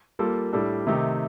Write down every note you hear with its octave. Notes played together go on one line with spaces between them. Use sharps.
G3 A#3 F4 A4
A2 G3 D4 A4
C3 D#3 A3 D#4 G4